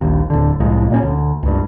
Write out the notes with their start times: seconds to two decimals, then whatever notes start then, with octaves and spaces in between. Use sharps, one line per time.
0.01 D#1 A#1 D#2
0.30 D1 D3
0.60 C2 A2 F3 G#3
0.90 A#2 G3 C#4
1.03 D2
1.43 C#2 G2